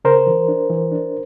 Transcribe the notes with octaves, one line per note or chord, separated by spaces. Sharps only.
C#3 A#4 C5
E3
D4
E3
D4